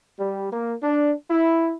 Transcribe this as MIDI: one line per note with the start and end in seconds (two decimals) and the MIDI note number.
0.19 0.49 55
0.52 0.73 58
0.82 1.13 62
1.31 1.73 64